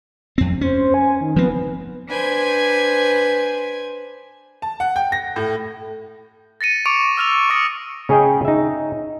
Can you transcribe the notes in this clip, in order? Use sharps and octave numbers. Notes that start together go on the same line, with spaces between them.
F2 C4
C#4 C5
G#5
D#3
F3 B3 C4
D4 B4 C5 G#5 G#6
A5
F#5
G5
A#6
A2
A6 A#6 C#7 D#7
C#6 D6 C#7 D7 F7
E6 F6 F7
C#6 D#6 A#6 C#7
C#3 C#4 G#4 D#5 G5
D#4 E5